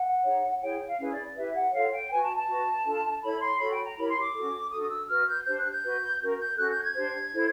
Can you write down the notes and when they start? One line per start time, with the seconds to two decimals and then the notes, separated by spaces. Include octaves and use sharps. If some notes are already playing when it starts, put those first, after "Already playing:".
Already playing: F#5
0.24 D#4 G#4 C#5
0.61 E4 G#4 C#5 G5
0.86 F5
0.98 C#4 E4 G#4 B4
1.11 D5
1.36 E4 G4 B4 E5
1.54 F#5
1.73 F4 A4 C#5 F5
1.91 G5
2.10 F#4 B4 G#5
2.22 A5
2.35 A5
2.47 F#4 B4
2.84 D4 F4 A4
3.22 E4 A4 C#5 B5
3.41 C6
3.59 F#4 A4 C#5 B5
3.72 G5
3.84 A#5
3.96 E4 G4 A#4 C#5 B5
4.09 C6
4.21 D6
4.34 C#4 F#4 A4
4.70 D4 F#4 A4 D#6
4.81 D#6
4.89 E6
5.08 F#4 B4 F6
5.27 G6
5.45 D4 G4 C5 G6
5.58 F#6
5.70 G6
5.83 F#4 B4
6.20 C#4 F#4 A#4
6.38 G6
6.57 C#4 F#4 A4 F#6
6.70 G6
6.82 G#6
6.94 D4 G4 C5
7.32 E4 A4 C5